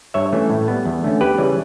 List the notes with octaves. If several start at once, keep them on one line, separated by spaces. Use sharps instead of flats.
G2 C#5 E5
E3 A3 C#4
A2
G3 B3
E2
D3 A3 C#4
E2 G4 B4
C#3 E3 G3 C#4